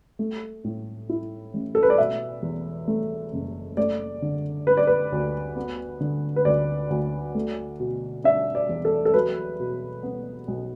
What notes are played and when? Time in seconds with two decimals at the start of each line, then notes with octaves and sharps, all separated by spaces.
0.19 A3
0.64 A2
1.09 E4
1.54 A1
1.75 A4
1.83 B4
1.90 D5
1.98 B2 E5
2.43 E2
2.88 A3
3.33 F#1
3.77 A3 D5
4.22 D3
4.67 D4 B4
4.77 D5
4.87 B4
5.12 D2
5.56 B3
6.00 D3
6.36 B4
6.45 D2 D5
6.90 D2
7.35 A3
7.80 B2
8.24 D4 E5
8.55 D5
8.69 E2
8.85 A4
9.05 A4
9.14 F#3 B4
9.59 B2
10.03 B3
10.48 B1